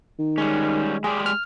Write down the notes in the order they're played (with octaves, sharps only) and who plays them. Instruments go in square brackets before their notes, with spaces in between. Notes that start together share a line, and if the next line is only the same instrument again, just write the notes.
[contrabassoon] D#3
[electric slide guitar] G3 C#4 [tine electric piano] G#3
[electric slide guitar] G#3 G4 D5 [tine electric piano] G#4
[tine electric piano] F6